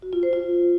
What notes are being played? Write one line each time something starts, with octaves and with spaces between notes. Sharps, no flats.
F#4
F4
C5
F4